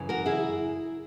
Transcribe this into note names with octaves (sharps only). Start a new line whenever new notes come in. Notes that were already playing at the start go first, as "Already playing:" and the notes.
Already playing: F#2 C#3 E3
F#4 A#4
E4 G#4